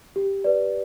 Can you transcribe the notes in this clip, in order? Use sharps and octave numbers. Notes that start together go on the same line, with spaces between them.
G4
B4 D5